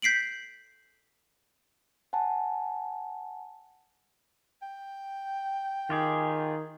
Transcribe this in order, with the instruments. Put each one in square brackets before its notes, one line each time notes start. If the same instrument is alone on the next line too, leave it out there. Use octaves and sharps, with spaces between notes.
[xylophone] G6 B6 C7 D7 F#7
[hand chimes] F#5 G#5 A5
[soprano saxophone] G5
[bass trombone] D#3 [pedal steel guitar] F4 G4 G#4